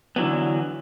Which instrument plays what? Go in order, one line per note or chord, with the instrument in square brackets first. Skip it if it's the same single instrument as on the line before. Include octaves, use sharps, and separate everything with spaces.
[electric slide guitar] D3 E3 F#3 B3